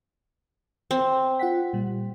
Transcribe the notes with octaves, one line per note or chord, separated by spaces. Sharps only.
C4
F4 F#5 B6
A#2 G3